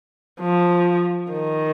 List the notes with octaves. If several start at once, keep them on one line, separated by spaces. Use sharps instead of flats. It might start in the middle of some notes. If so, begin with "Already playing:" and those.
F3
D#3